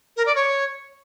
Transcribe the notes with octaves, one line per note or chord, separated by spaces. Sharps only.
A#4
D5
C#5